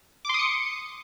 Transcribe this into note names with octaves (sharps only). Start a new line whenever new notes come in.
C6 D6 D#6 C#7